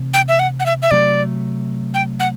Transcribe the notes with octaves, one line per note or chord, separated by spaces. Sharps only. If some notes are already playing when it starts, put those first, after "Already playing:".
Already playing: C3 E3 A3
G5
E5
F#5
F#5
E5
E5
C3 F#3 A3 D5
G5
F#5